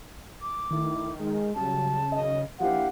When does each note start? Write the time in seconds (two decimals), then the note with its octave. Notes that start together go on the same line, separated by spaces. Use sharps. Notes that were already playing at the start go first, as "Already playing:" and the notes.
0.40 D6
0.70 D#3 A3 E4
1.19 G#3
1.56 C#3 F#3 G3 A5
2.12 D#3 F#3 D#5
2.60 F3 A#3 D4 E4 G4 F5 F#5